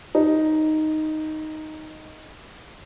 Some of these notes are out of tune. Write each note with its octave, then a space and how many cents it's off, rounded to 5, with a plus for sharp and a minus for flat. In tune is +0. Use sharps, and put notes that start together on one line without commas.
D#4 +0